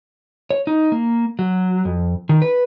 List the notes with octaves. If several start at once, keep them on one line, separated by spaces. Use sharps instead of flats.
C#5
D#4
A#3
F#3
F2
D#3
B4